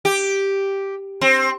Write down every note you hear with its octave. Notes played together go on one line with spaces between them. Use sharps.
G4
C4